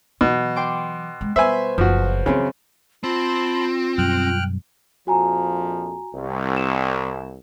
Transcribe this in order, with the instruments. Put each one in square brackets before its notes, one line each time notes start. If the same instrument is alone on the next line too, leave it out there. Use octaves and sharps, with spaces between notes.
[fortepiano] B2 [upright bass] E3 F#3
[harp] G5 C6 D6
[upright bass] G#3
[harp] B2 B4 C5 [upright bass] G3 [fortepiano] E5 G#5
[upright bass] F#1 [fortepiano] F3 F#4
[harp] F#2 C4 [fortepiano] C#3 [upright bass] E3 B3
[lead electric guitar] C4 [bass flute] F4 [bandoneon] A5 B5 C6
[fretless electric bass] F#2 B2 G3 [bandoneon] G5 F6 F#6
[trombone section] A#1 F2 F3 [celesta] F#4 G#5 A#5
[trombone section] C2
[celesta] E7